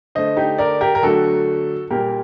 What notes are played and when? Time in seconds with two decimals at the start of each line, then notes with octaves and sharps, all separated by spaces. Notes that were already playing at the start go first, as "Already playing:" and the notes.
0.15 D3 A3 C5 D#5
0.37 D#4 G4
0.58 A#4 D5
0.81 G4 A#4
0.95 A#4
1.02 D3 F#3 A3 F#4 A4
1.90 A#2 G3 A#3 G4 A#4